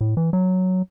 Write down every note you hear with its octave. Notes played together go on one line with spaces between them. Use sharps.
A2
E3
F#3